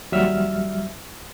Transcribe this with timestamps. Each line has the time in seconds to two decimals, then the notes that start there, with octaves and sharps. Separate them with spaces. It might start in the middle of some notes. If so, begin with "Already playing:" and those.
0.12 D#2 F#3 G3 E5 E6 F6